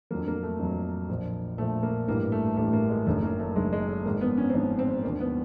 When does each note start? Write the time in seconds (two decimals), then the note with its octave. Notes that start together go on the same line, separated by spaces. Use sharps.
0.11 F2 D3 F#3 A#3
0.27 A#3
0.43 A3
0.59 F2 D3 F#3
1.09 A#1 A#2 F3
1.58 A#1 A#2 F3 A3
1.83 A#3
2.08 A1 G2 E3 G3 A#3
2.32 A3
2.57 A1 G2 E3 G3 A3
2.73 A#3
2.90 G#3
3.06 F#1 F#2 D#3 A3
3.23 A#3
3.40 A3
3.56 F#1 F#2 D#3 G#3
3.72 G#3
3.88 A3
4.06 G#1 G#2 F3 A#3
4.21 B3
4.37 C#4
4.50 C4
4.54 G#1 G#2 F3 C#4
4.79 C4
5.03 E1 D#2 D3 F3 A#3
5.20 B3